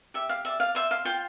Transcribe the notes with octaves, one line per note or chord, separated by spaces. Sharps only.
G4 E5
F5
D5 E5
F5
C5 E5
F5
F4 G5